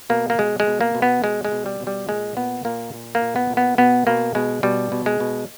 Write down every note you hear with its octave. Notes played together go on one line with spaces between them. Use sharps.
B2 A#3
A#3
B2 G#3
G#3
B2
A#3
B2
B3
B2 G#3
G#3
B2
G3
B2
G3
A#2 G#3
A#2 B3
A#2 A#3
A#2
A#3
A#2
B3
A#2
B3
B2 B3
B2 A#3
B2 G#3
B2 G3
B2
G#3
B2